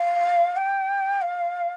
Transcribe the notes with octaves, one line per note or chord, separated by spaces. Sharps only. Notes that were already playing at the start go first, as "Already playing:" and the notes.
Already playing: F5
G5
F5